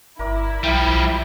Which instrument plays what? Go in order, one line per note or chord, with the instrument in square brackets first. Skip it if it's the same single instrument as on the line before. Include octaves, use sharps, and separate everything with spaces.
[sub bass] G1 [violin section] E4 [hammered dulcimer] A#4 D5
[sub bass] B1 [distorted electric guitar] F3 G3 [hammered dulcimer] F5 G5